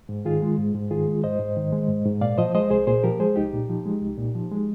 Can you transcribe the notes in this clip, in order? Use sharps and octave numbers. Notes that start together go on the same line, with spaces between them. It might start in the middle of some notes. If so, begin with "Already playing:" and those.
G#2
D#3 F4 G#4
G#3
G#2
G#2
D#3 F4 G#4
G#3
G#2 C5 D#5
G#2
D#3
G#3
G#2
G#2
A#2 D5 F5
F3 C5 D#5
G#3 C5 D#5
C2 G#4 C5
A#2 G#4 C5
F3 G4 A#4
G#3 G#4 C5
C2 D#4 G4
A#2
F3
G#3
C2
A#2
F3
G#3